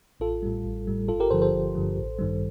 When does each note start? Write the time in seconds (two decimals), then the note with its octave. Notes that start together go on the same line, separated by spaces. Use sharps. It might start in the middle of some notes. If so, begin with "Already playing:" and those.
0.20 A1 F4 A4
0.42 A2 G3
0.64 A1
0.87 A2 G3
1.08 G1 F4 A4
1.20 G4 A#4
1.30 G2 D3 F3 A4 C5
1.42 A4 C5
1.53 G1
1.75 G2 D3 F3
1.97 A1
2.19 G2 D#3 G3